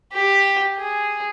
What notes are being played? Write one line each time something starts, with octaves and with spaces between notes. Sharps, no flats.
G4
G#4